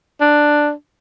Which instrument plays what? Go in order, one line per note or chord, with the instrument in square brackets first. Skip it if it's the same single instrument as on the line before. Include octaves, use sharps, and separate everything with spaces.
[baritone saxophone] D4